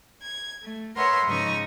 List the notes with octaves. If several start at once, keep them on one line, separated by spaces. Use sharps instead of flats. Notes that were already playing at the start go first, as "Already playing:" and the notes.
G#6
A3
A#4 B4 C#5 E5 F#5 C6
G#2 C#3 F3 D#4 D#5 C#6